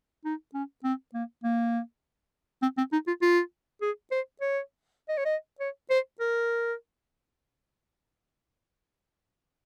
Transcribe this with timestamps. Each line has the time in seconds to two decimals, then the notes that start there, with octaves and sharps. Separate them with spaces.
0.25 D#4
0.54 C#4
0.84 C4
1.14 A#3
1.44 A#3
2.62 C4
2.78 C4
2.92 D#4
3.07 F4
3.22 F4
3.81 G#4
4.11 C5
4.41 C#5
5.09 D#5
5.18 C#5
5.25 D#5
5.60 C#5
5.90 C5
6.20 A#4